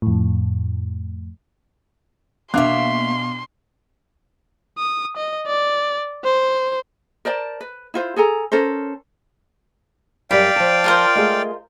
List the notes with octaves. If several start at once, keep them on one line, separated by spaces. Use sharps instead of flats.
F2 A2
B2 A#3 B3 D4 E5 F5 C6 D6
D#6
D#5
D5
C5
A#4 C5 D5 A5
B4
E4 F4 C5
G#4 A4 G#5 A#5
C#4 A4 A#4 C5
F#2 G3 D5 F5 G5 B5
F3 A5
F4 A#4 C5
G#3 A3 G#4